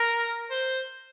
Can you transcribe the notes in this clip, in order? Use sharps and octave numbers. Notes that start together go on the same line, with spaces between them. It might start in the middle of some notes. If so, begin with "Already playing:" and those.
Already playing: A#4
C5